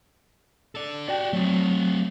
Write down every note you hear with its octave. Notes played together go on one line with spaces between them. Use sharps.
A4 D5
F#4 G4 D5 G5
F#3 A3 C4